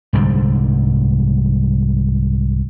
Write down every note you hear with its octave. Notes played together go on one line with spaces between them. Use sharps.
C2 G#2 D3 G3